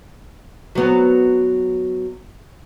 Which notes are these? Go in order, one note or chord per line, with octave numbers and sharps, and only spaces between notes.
F#3 B3